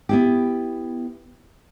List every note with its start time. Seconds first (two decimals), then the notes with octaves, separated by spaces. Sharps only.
0.09 B3 E4 G4